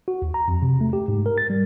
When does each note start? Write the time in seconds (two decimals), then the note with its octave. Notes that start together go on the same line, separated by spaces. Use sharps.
0.08 F#4
0.22 D#2
0.34 A#5
0.48 F2
0.62 C3
0.81 A3
0.93 G4
1.08 G#2
1.26 A#4
1.38 A6
1.50 G3